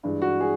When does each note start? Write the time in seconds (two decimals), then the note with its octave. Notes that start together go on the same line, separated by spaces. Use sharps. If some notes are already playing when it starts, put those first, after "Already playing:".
0.03 G2 E3 G#3
0.22 F#4
0.41 G#4